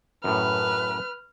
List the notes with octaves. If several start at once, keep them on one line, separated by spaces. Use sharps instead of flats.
F#2 A2 B4 F6